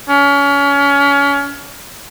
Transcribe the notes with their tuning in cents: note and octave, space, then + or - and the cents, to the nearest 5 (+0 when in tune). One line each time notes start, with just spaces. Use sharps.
C#4 +30